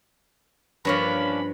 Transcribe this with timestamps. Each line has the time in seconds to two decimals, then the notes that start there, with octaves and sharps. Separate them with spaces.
0.85 G2 F3 A#3 C#4 D4 B5